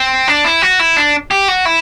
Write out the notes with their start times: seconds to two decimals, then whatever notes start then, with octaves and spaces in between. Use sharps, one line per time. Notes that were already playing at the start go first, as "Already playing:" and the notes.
Already playing: C4
0.28 D4
0.44 E4
0.62 F#4
0.80 E4
0.97 D4
1.31 G4
1.48 F#4
1.65 E4